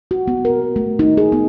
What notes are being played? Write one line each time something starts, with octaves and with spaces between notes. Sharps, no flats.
F#4
B3
A#4
A3
D#4
G#4
B3